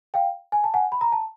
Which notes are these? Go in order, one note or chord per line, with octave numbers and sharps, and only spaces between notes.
F5 G5
G#5
A5
F#5 G#5
B5
A#5
A5